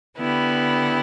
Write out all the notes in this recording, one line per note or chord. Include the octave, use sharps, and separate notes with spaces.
D3 B3 E4 G4